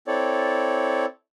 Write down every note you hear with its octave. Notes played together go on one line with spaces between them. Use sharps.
C4 E4 A4 C#5 D5